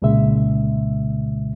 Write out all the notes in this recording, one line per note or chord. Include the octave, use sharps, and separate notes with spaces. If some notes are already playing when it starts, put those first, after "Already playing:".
C2 A#2 C#3 G#3 E5